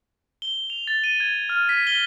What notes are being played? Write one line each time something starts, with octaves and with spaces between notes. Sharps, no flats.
G7
F7
A6
D#7
G#6
F6
B6
G7